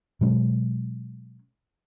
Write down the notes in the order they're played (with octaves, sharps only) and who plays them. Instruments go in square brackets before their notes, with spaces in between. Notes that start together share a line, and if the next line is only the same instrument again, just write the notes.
[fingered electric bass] B2 F#3 G#3 C#4